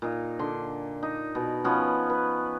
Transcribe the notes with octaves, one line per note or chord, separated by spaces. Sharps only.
A#2 D#4
D3 C6
D#4
B2
F3 B3 C#4
B4